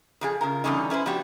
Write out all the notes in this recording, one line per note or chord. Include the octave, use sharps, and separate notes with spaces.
F2 F3 G#4
C#3 F4 A#4
E2 B2 D3 G3 C#4 D#4
C#4 E4 B4 C5
F3 B3 D4 F#4 G4